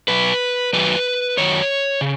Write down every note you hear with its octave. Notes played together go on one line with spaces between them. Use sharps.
B2 F#3 B4
F#2 D#3 F#3 B4
F#2 D#3 F#3 C#5
C#3